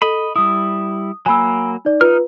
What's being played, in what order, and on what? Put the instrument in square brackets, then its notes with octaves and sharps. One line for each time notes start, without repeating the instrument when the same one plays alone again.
[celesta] A4 [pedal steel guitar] D#5 B5
[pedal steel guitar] G3 E4 [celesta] D#6
[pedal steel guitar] F#3 A#3 [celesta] G#5 B5 E6
[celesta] D#4 D5
[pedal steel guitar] D#4 F6 [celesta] F4 B4